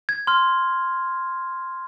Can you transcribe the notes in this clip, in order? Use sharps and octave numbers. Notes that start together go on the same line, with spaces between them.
G#6
C6 F6